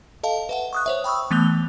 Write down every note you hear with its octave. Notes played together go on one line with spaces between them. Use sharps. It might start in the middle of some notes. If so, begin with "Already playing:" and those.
A4 D#5 F5 A5
B4 E5 F#5
C#6 D#6 F#6
C5 C#5 E5
G5 B5 C#6 D#6 E6
E3 A3 B3 F#6 F7 G7